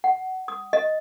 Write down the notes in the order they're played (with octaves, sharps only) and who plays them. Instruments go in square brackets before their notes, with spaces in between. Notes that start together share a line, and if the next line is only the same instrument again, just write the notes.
[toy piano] F#5
D#6
D#5